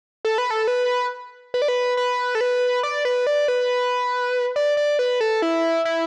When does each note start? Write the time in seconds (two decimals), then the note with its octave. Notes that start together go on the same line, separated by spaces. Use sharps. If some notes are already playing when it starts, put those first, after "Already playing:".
0.25 A4
0.38 B4
0.51 A4
0.68 B4
1.54 B4
1.62 D5
1.68 B4
1.97 B4
2.35 A4
2.41 B4
2.83 D5
3.05 B4
3.27 D5
3.48 B4
4.56 D5
4.77 D5
4.99 B4
5.21 A4
5.42 E4
5.85 E4